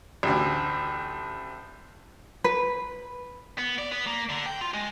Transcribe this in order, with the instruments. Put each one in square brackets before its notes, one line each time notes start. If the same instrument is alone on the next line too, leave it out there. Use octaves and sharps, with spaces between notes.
[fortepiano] A1 D2
[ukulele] B4
[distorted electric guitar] B3
D5
B3
A#3
D3
G5
F4
G#3